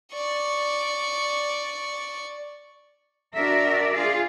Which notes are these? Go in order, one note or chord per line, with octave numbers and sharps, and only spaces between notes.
D5 C#6
D4 F#4 A#4 D5 E5
F4 G#4